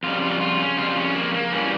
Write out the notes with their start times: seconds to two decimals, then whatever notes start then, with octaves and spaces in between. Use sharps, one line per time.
0.03 F2 C#3 G3 F4
0.22 F4
0.41 F4
0.59 C#4
0.77 F2 C#3 G3 F4
0.97 C#4
1.15 A#3
1.34 A#3
1.52 G2 E3 G3 C#4